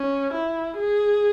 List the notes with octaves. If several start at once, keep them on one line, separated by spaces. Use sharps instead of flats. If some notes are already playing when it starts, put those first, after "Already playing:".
Already playing: C#4
E4
G#4